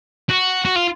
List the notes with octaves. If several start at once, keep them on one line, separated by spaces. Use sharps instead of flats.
F#4
F#4
F4